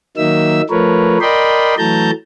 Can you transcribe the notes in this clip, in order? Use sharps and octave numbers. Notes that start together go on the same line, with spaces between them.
D#3 F#3 A#3 D#4 E5 E6
F3 A3 A#4 B4 C#5
A#4 D5 D#5 G5 B5 C6
E3 F#3 A3 A5 A#5 G6